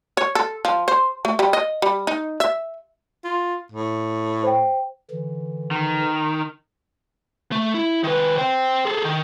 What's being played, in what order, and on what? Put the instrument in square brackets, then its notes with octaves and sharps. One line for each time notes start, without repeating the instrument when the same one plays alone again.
[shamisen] C#5
A4
F3
C5
A3
G3
D#5
G3
D#4
E5
[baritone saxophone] F4
A2
[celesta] C5 G5
[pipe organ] D3 E3
[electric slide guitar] D#3
[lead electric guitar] A3
E4
D#3 B4
C5 G5
G#4 A4
D#3